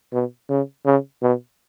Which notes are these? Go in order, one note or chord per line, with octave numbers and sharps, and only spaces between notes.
B2
C#3
C#3
B2